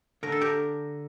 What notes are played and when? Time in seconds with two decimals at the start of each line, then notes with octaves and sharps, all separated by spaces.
0.23 D3 A3 D4 A#4
0.32 A4
0.41 G4 A#4